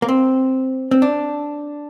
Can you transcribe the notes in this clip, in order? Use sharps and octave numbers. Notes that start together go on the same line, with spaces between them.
A#3
C4
C4
D4